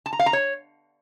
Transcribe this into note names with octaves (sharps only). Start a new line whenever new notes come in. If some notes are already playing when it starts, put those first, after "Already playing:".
A5
A#5
F5
A#5
C#5